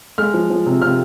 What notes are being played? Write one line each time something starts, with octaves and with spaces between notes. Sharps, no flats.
G#3 F6
F3
F3
C3
C3 F6